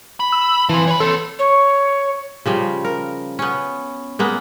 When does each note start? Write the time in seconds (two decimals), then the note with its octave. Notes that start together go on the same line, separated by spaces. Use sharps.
0.20 B5
0.32 E6
0.69 E3 F3 C4
0.87 C#5 B5
1.00 C4 A4 C#5
1.39 C#5
2.46 C#3 F3 G3
2.85 A#4
3.39 B3 C#4
4.19 G#3 A#3 B3